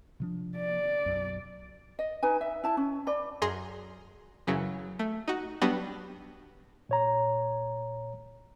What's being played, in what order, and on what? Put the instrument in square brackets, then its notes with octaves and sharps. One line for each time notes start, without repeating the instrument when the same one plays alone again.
[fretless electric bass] C3 F3 D4
[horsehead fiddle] D5
[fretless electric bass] B1 F#2
[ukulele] D#5
D#4 B4 G#5
E5
E4 A5
C#4
D5 B5
[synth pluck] F#2 G#4 A#5 C6
F#2 C#3 E3 F#3
A3
D#4 F#4
F#3 G3 B3 D4 F#4 G4
[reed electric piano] A#2 C#5 A#5